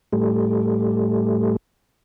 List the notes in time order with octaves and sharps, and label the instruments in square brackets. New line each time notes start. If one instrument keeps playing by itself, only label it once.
[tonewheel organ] A2 G3 A3